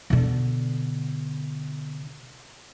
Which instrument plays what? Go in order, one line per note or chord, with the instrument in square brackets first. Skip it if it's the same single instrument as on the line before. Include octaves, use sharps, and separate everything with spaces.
[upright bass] B2 D3